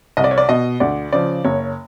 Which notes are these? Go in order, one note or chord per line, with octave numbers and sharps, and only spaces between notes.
C2 D#5
D5
C#5
D5
B2 D#5
D2 D5
C#3 F3 D5
F#1 C#5